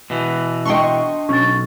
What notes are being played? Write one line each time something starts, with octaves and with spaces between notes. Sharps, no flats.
B2 E3
D4 D#5 G5 C6 C#6
B1 C#4 C#6 A6